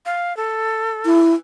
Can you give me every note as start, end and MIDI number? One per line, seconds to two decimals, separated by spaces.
0.06 0.36 77
0.37 1.19 69
1.05 1.33 64